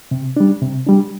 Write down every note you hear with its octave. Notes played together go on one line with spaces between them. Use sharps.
C3
G3 D4
C3
G3 D4